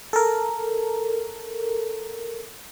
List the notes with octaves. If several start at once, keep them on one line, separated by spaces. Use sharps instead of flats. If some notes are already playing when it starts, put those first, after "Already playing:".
A4 A#4